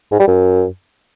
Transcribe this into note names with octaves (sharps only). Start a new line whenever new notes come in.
G#2
G3
F#2